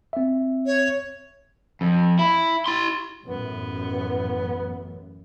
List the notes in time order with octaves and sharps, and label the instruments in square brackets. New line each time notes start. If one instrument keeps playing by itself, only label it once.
[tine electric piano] C4 E5
[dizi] C#5
[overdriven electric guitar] F2
E4
E4 C6
[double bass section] A1 F#2 A2 [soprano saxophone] B3